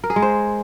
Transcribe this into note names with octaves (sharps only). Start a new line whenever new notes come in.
A#4
G#4
G#3
C5